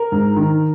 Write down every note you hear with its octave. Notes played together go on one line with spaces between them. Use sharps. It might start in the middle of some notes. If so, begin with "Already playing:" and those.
Already playing: A#4
G#2
D#3